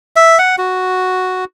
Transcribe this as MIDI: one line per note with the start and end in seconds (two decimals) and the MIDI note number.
0.16 0.38 76
0.39 0.56 78
0.58 1.45 66